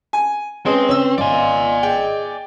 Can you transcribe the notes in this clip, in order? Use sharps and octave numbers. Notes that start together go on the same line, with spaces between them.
G#5
G#3 C4 C#4 G#4 B4
C#3 C#4 E6
G#1 D5 D#5 F5 G#5 C6
G#4 D#5 G5